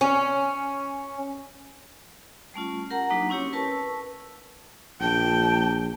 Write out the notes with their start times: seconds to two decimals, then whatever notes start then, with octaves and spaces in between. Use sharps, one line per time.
0.01 C#4
2.54 G3 A3 C#4 F4
2.90 G4 A#4 F#5 A#5
3.10 F#3 A#3 D4 D#4 F#4
3.29 C4 C#4 E4 G4 C#5
3.53 A#4 B4 A5 C#6 E6
5.01 A#1 G5 A5